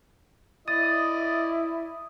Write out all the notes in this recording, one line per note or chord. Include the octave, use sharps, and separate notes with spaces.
E4 D5 D#5 D#6 A6